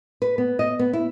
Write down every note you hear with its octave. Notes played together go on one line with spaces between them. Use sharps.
B4
B3
D#5
B3
E4